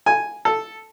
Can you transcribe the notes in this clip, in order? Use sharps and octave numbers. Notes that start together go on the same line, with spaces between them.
G#5
A4